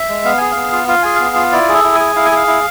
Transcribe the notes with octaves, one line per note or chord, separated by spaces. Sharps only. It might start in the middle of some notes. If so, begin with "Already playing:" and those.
Already playing: E5
G#3
B3 F5
G#4 G#5
B3 F5
F4
F4 F5
G#4 G#5
B3 F5
F4
E4 D5
G#4 A4
E4
G#5
G#4
E4 F5
G#5
G#4 F5
E4